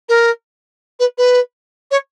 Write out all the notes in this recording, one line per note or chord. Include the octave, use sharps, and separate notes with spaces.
A#4
B4
B4
C#5